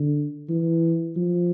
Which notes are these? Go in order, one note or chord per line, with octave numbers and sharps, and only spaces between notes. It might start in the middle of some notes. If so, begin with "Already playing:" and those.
Already playing: D3
E3
F3